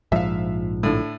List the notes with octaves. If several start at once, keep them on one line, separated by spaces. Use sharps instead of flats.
A#1 G#2 F3 E5 F5
A2 D3